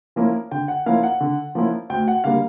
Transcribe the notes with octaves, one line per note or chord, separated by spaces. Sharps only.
F3 A#3 C#4 E4
D3 G5
F#5
F3 A#3 C#4 E4 F5
F#5
D3
F3 A#3 C#4 E4
D2 G5
F#5
D3 G3 A#3 F5